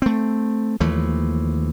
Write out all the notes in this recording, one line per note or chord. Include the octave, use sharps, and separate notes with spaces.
A3 C4
D#2 E3 F3 A3